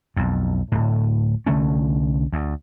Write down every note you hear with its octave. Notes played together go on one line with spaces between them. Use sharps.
B1 F2
D1 A2
C2 D3 A3 C#4
D2